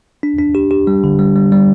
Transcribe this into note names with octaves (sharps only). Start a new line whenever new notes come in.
D4
D4
G4
G4
G3
D3
G3
G3
G3